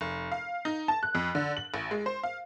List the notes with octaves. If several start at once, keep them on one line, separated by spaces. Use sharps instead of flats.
F1
F5
D#4
A5
F#6
F2
D3
F#7
A1
G#3
C5
F5